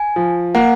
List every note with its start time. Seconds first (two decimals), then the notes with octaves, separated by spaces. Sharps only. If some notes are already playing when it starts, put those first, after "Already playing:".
Already playing: G#5
0.16 F3
0.55 A#3 F#5